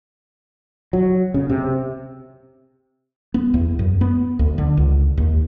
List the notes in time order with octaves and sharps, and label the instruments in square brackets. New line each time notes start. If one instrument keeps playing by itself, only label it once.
[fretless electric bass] F#3
C#3
C3
B3
E2
F#2
B3
D2
D3
C#2
D#2